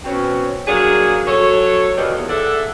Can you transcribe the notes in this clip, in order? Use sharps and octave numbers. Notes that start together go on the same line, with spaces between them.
B2 C4 C#4
F#3 A#3 D4 G#4
F#3 A4 C#5
B2 D#3 G3 A#3 B3
E2
G#4 A4 D5 E5 F#5